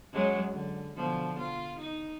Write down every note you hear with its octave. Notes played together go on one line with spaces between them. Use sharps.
F#2 F#3 G#3
D3
B2 D3 F3
F4
D#4